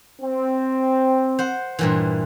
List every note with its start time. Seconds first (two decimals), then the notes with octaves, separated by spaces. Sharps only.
0.22 C4
1.39 C5 F#5
1.79 G2 A#2 E3